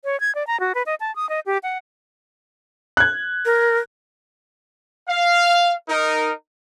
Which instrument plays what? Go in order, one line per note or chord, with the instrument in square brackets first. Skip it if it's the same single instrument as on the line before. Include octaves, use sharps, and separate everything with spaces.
[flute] C#5
G#6
D5
A#5
F#4
B4
D#5
A5
D#6
D#5
G4
F#5
[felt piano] F#6 G#6
[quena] A#4
[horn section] F5
D#4 A#4